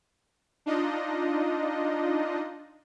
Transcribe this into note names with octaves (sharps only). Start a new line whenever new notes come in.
D4 D#4 F4 D#5